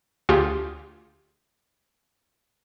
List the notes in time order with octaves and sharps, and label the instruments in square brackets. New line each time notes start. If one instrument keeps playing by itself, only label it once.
[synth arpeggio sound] D2 F4 G4 G#4